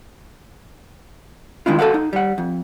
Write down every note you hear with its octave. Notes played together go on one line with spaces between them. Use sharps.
D#3 G#3 D4 E4 F4
F#4 A4 A#4 F5 F#5
D#4
G3 F#5
F2